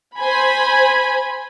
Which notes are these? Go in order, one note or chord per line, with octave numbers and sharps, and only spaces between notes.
C5 G#5 B5